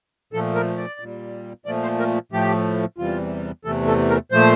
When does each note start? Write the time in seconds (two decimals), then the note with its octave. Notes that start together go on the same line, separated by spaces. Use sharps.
0.33 A#2 F3 A3 A4
0.55 A#4
0.78 D5
1.00 A#2 G3
1.66 A#2 F3 A3 D5
1.83 C5
1.99 A#4
2.32 A2 F3 A3 G4
2.98 E2 C3 E3 G3 F4
3.65 E2 C3 E3 A3 A4
3.87 A4
4.10 A#4
4.31 A#2 F3 A3 C5